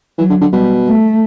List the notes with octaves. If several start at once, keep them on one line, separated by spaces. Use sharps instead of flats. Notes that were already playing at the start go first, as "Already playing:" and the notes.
E3 F#3
D3
D3
B2 G3
A3